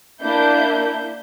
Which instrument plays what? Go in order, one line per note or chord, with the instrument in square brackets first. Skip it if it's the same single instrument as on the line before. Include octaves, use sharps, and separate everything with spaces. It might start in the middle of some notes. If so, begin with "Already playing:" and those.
[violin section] A#3 D4 E4 G6